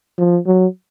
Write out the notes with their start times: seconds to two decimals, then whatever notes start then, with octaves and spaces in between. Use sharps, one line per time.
0.18 F3
0.47 F#3